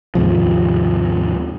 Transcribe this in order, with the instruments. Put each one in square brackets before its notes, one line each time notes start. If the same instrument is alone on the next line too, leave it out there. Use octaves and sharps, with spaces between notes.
[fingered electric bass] D#2 G#2 C3 F3